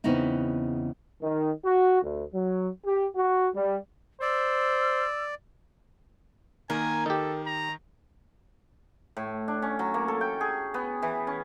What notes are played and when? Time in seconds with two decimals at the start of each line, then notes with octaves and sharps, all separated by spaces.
0.04 E2 C#3 B3 C4 D#4 E4
1.21 D#3
1.63 F#4
2.03 D2
2.33 F#3
2.84 G4
3.15 F#4
3.54 G3
4.22 C5 D5 E6
6.70 D#3 A#3 A#4 G#5
7.06 D#3 D#4 G4 A4
7.46 A#5
9.17 A2
9.48 D4
9.62 C#4
9.79 F#3
9.94 A#3
10.08 A4
10.21 G5
10.41 G#4
10.74 B3
11.02 E3
11.27 C#4